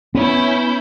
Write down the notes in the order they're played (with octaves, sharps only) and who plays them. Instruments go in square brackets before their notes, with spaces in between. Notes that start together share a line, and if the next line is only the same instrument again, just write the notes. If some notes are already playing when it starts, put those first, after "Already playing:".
[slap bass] B3 [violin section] C#4 E4 G6